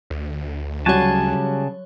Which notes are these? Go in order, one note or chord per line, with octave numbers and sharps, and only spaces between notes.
D2
C#3 F#3 G3 F#4 G4 C#5 G#5 A5